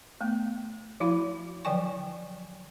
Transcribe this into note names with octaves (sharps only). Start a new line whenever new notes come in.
A3 B3
F3 E4 F#4 F5 B5
D3 F3 F#3 G5 G#5 C#6